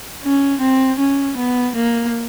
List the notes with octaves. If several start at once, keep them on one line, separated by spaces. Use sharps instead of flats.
C#4
C4
C#4
B3
A#3